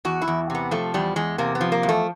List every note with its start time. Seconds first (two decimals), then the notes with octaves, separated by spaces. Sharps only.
0.05 E2 F#4
0.22 E4
0.28 E2
0.50 C3 B3
0.71 F3 A3
0.94 E2 G3
1.16 E2 G#3
1.38 C3 A#3
1.55 B3
1.61 F3
1.72 A#3
1.83 E2
1.89 A3